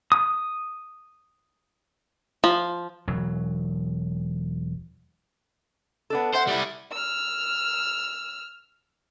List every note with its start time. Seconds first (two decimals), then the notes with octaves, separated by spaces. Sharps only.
0.12 D#6
2.44 F3
3.08 E1 F#3
6.10 B3 D4 A4
6.35 C5 E5 F#5
6.48 G3 E4
6.92 E6 F6